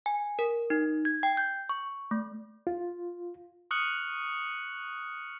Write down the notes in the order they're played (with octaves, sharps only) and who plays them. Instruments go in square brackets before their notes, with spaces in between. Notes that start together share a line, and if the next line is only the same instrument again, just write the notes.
[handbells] G#5
A#4
D#4
G#6
G5
G6
C#6
A3
[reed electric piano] F4
[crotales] C#6 D#6 F6 F#6 C#7 F#7